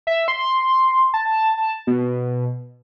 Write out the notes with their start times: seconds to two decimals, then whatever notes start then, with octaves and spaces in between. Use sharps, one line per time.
0.07 E5
0.28 C6
1.14 A5
1.87 B2